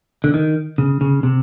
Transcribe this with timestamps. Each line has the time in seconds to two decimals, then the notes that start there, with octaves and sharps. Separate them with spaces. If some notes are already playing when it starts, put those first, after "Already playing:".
0.24 D3
0.34 D#3
0.78 C#3
1.01 C#3
1.23 C3